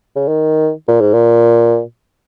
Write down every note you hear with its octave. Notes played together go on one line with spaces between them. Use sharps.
C#3
D#3
A#2
G#2
A#2